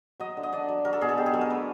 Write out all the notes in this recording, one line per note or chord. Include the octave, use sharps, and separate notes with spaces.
F#3 D#5
D3
D#5
D4 D5
F#3
F#3 A#4
A4
B2 G#4
A4
B2 G4
G#4
F#3 A4
A#4
A3 B4